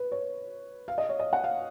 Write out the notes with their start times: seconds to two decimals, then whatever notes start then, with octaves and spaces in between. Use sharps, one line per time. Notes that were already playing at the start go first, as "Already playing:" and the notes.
Already playing: B4
0.12 C#5
0.88 F5
0.98 D#5
1.09 C#5
1.19 D#5
1.33 F#5
1.44 F5